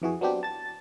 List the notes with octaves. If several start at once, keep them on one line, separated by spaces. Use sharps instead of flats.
F2 E3 F#4 G#4
F#3 B3 C4 D4 F#4 G4
A5 A6